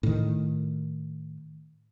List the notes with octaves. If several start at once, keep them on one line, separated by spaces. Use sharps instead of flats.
A2 D#3